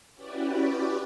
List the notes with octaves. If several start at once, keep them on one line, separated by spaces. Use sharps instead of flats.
C#4 E4 F#4 G4 B4 D5